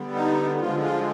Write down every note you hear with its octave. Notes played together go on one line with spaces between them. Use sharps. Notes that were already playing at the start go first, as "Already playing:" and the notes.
Already playing: D3 G3 B3
D#4
D3 F3 G#3 F4
F4